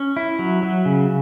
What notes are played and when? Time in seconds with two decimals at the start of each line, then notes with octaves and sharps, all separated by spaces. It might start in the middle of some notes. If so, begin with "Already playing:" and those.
Already playing: C#4
0.17 E4
0.39 F#3
0.63 F#3
0.85 C#3